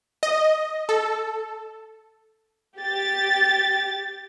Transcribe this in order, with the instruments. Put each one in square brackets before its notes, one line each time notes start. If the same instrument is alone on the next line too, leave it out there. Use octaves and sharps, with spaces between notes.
[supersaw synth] D#5
A4
[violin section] G4 A6